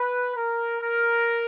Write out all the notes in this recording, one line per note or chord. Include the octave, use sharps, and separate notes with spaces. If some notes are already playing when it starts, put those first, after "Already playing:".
Already playing: B4
A#4
A#4